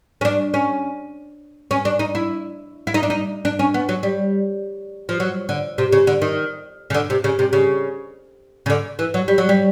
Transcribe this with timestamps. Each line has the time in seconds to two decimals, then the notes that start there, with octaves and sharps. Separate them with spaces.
0.21 C#4
0.25 D4
0.54 C#4
1.71 C#4
1.85 D4
1.99 D#4
2.15 E4
2.87 E4
2.94 D#4
3.03 D4
3.10 D#4
3.45 D4
3.59 C#4
3.74 B3
3.89 F#3
4.03 G3
5.09 F3
5.20 F#3
5.49 D3
5.78 C3
5.92 C#3
6.07 D3
6.22 D#3
6.90 C#3
6.94 D3
7.10 C3
7.24 C#3
7.39 C3
7.53 C#3
8.66 C#3
8.70 D3
8.99 E3
9.14 F#3
9.28 G3
9.38 F#3
9.49 G3